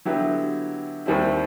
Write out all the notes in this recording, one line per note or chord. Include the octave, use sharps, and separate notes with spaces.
D3 F#3 B3 E4 G4
D#2 D#3 G3 C4 E4